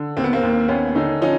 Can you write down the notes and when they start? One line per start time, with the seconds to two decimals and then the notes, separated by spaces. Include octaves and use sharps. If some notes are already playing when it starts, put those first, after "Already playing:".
Already playing: D3
0.17 D#2 C4
0.24 B3
0.33 A#3 C4
0.43 D#2
0.68 D#2 B3 C#4
0.95 D3 C#4 D#4
1.22 F3 C#4 D#4